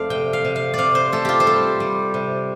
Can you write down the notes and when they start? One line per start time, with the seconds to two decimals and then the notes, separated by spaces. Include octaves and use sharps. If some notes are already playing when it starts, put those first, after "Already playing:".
Already playing: F2 A3 C5 D5 F5
0.10 C3 G5
0.33 F5
0.45 C3
0.56 F5
0.74 C3 D5 F5
0.95 C5
1.12 A3 A4
1.25 F4 G4
1.40 C5
1.46 G3 A4
1.80 G3
2.14 C3